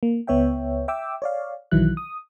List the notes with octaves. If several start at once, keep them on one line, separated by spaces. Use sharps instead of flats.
A#3
C#2 B3 C#5 E5 G5
E5 G5 D6 E6
C#5 D5 F5
B1 D#3 E3 F#3 E4 F#6
D#6